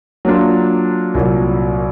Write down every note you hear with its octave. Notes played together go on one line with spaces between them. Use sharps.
F#3 A#3 D4 F4
C2 A#2 F#3